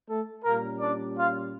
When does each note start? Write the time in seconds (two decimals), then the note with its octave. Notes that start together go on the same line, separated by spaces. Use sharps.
0.09 A3 A4
0.44 A#2 G3 A#3 C#4 A#4
0.80 D4 D5
1.16 F4 F5